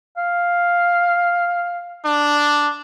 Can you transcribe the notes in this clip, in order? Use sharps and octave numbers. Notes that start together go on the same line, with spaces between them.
F5
D4